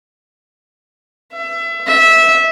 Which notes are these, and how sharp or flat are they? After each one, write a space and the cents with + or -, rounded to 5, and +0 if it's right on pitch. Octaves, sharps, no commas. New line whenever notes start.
E5 +25
E5 -15